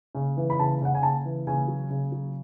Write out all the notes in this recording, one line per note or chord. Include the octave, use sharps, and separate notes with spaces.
C#3
E3
B5
C#3 A5
C#3 F#5
G#5
C#3 A5
E3
C#3 G#5
F#3
C#3
F#3